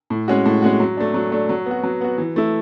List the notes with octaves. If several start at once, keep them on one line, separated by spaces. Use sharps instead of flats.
A2
G#3 C#4 F#4
A2
G#3 C#4 F#4
F#3
A3 D4
F#3
A3 D4
F#3
B3 F#4
F#3
B3 F#4
E3
A3 E4